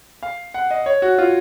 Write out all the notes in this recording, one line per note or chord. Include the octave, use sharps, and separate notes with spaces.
F5
F#5
D#5
C#5
F#4
F4